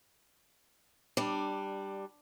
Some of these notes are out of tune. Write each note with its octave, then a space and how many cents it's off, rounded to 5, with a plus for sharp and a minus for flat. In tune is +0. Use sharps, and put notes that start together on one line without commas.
G3 +0 D4 +15